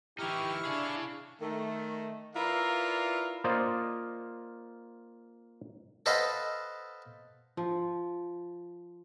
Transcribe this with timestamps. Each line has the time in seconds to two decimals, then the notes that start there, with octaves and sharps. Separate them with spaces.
0.19 E3 D#4 E4 G4 C#6 F6
0.65 D4 G#4 F5
1.41 D#3 A3
2.36 E4 F4 A#4 B4 D5 F5
3.44 A#3 F4 C5 D5 D#5
6.06 A4 B4 C5 D#5 F5 F#5
7.57 F3